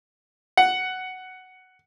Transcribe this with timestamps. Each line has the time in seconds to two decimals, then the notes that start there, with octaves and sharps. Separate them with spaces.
0.57 F#5